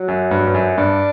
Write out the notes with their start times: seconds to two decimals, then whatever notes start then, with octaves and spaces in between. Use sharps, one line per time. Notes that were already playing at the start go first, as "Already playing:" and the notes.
Already playing: F#3
0.08 F#2
0.31 G2
0.47 G2
0.55 F#2
0.77 G2 D4